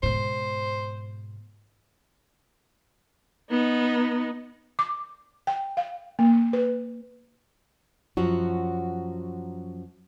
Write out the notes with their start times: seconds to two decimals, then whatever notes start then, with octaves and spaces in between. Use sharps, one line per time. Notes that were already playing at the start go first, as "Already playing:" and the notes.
0.03 G#2 B2 C5
3.51 B3 D#4
4.79 D6
5.47 G5
5.77 F5
6.19 A#3
6.53 B4
8.17 F#2 F3 F#3 F#4